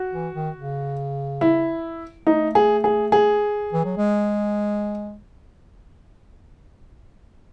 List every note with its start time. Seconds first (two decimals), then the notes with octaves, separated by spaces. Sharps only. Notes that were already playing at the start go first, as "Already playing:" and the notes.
Already playing: F#4
0.13 E3
0.35 D#3
0.56 C#3
1.41 E4
2.27 A3 D#4
2.55 G#4
2.84 G#4
3.12 G#4
3.73 E3
3.85 F#3
3.97 G#3